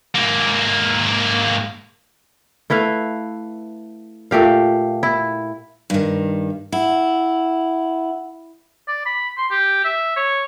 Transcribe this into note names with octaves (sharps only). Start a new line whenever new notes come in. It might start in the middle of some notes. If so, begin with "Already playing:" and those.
G#2 A#3
A3 E4 B4 F5
A#2 A3 G4 F5
E4
G2 D#3
E4 F#5
D5
B5
C6
G4
E5
C#5